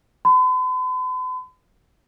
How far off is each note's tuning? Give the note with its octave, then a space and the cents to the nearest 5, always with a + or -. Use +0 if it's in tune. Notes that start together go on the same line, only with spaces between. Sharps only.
B5 +45